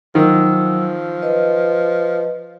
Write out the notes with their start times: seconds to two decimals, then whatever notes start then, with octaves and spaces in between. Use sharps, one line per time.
0.15 D#3 F3 F#3 E6
1.22 B4 D#5